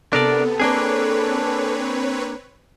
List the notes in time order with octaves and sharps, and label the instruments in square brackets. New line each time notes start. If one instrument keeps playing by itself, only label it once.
[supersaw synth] C3 B3 [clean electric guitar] D4 A#4 D5 [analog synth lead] A4
[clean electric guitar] A#3 D4 G#4 [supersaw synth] C4 B4 C#5